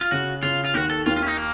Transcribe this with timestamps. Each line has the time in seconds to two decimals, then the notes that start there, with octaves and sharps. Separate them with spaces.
0.01 F4
0.11 C#3 F#4
0.43 C#3 F4
0.64 F4
0.74 D#2 D#3 F#4
0.90 A4
1.06 D#2 D#3 F4
1.16 F4
1.23 C#4
1.27 D#4
1.37 A#3